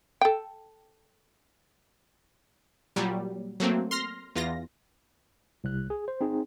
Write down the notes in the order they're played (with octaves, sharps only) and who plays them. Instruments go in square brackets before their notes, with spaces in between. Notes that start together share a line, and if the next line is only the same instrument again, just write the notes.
[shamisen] A4 G5
[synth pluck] A#2 F#3 G3
F#3 A3 A#3 C4
C6 F6 A#6
E2 F4 A#6
[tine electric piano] C2 F#6
G#4
C5
C4 D#4 G#4